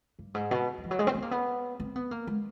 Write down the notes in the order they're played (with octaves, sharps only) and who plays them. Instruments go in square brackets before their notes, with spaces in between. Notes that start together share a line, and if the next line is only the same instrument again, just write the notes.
[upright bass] G2
G#2
B2
E3
F3
F#3
G#3
C4
B3
A#3
B3
C4
B3
A#3
G#3